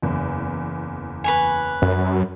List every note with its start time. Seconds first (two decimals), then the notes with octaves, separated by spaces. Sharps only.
0.02 F#1 E2
1.24 B4 C#5 G#5
1.82 F#2